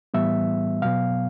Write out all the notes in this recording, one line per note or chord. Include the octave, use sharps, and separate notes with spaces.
A2 E3 G3 B3 E5
B2 F#3 B3 F5